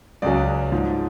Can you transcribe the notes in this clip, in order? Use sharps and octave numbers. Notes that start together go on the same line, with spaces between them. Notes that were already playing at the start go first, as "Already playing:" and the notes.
C#2 C#3 F#3 D5
G#2 F3